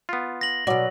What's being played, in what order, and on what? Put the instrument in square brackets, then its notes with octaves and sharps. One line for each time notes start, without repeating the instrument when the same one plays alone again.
[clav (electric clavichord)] B3 F4
[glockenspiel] A#6 F#7
[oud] B2 D5 [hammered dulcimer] F#3